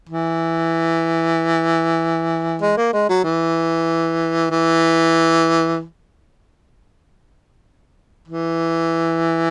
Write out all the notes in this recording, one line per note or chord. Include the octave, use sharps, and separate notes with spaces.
E3
G#3
A#3
G#3
F#3
E3
E3
E3